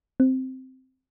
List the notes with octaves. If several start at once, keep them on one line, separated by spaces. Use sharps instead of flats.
C4